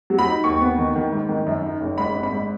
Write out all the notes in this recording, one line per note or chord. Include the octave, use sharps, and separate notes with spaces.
F#3
B5
D#4
D#2 C#6
B3
D#3
D#3
G#2
D#3
F#2
D#4
F#1
G#2 B5
G#1
B5
G#2